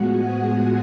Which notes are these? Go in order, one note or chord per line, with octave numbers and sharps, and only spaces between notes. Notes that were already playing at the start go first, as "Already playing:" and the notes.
Already playing: A2 F3 G#3 B3 F#4 F#5
G#4 G#5